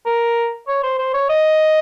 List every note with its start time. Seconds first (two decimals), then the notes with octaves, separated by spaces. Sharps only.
0.06 A#4
0.68 C#5
0.83 C5
0.99 C5
1.14 C#5
1.30 D#5